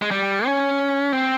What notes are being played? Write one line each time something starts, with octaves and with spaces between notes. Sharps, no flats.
G#3
G3
C#4
C4